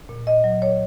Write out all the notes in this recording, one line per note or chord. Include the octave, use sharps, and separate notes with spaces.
A#2
A#2 D#5
F#3
A#2 C#5